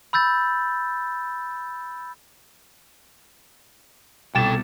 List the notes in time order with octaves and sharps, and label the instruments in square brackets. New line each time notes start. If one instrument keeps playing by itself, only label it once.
[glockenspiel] B5 E6 G6 A6
[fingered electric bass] C2 [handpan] B2 [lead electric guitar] A4 G5 [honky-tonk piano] D6 A6 E7